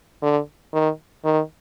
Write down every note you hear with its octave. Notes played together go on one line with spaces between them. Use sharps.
D3
D#3
D#3